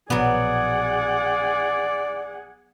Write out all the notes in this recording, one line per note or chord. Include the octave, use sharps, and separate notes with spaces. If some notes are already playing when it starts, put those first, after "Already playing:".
A#1 B2 F#3 B3 G#4 D5 F#5